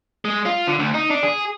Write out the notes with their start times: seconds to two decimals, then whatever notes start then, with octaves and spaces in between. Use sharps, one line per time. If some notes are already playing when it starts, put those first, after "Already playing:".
0.25 G#3
0.46 F4
0.68 D3
0.79 D2
0.94 D#4
1.11 D4
1.23 G#4